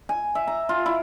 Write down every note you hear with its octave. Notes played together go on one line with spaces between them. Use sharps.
G#5
E5
A#5
F4
E4